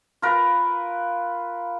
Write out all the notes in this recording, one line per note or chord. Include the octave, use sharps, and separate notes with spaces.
F4 A#4 B4